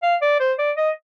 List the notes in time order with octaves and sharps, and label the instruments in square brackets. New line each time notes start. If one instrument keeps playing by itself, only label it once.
[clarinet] F5
D5
C5
D5
D#5